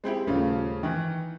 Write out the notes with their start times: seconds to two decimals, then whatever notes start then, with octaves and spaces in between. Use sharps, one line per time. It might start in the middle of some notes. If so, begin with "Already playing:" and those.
0.04 G#3 C4 E4 G4
0.27 D#1 C#3 A3 F4
0.83 D#3 E3